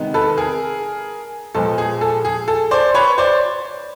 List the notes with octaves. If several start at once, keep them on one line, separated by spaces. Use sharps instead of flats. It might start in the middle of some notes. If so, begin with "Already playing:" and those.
Already playing: C3 D#3 G#3 B3 D#4
A4 B4
G#4 A#4
A#2 F3 G#3 B3 A4
G#4
A4
G#4
A4
C5 D5
B4 C#5
C5 D5